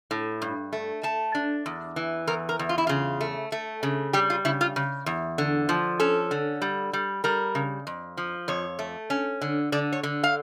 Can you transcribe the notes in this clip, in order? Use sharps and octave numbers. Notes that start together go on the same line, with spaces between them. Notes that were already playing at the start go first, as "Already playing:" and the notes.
A2
G2
A3
A3 A5
D4
E2
E3
E2 A#4
A#4
E2
F4
E4
C#3 F4
A3
A3
C#3
G3 G4
F4
C#3 E4
F4
C#3
E2
D3
F3
C#4 A4
D3
G3
G3
G3 A#4
C#3
F2
F3
F2 C#5
A3
C#4
D3
D3 D5
C#5
D3
F5